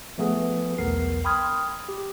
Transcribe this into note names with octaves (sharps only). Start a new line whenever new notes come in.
F3 A3 B3 G#4 B4
B1 E2 B3 A#4 C7
G5 B5 C6 D#6 F6 G#6
G4